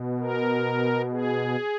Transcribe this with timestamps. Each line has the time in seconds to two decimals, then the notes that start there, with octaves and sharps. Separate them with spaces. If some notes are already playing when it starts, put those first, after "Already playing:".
Already playing: B2
0.20 A#4
1.11 G#4